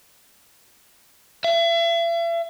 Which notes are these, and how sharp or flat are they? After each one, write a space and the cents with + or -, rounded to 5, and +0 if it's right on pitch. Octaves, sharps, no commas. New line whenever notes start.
E5 +40